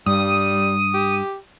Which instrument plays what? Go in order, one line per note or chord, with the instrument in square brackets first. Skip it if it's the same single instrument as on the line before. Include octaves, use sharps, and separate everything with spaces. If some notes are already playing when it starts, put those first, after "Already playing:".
[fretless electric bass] G2 [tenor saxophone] G3 [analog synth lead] D#6
[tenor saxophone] G4